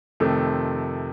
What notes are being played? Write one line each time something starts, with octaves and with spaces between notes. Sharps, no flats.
F2 C3 D#3 A3